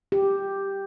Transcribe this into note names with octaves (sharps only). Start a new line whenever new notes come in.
G4